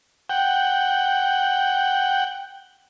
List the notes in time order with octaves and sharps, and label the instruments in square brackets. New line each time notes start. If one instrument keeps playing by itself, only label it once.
[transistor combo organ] F#5 G5